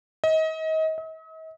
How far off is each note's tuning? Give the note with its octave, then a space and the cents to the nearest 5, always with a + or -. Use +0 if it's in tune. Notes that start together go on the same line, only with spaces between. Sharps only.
D#5 +30
D#5 +45